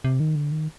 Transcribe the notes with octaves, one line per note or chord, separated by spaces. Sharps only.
C3
D#3
D3
D#3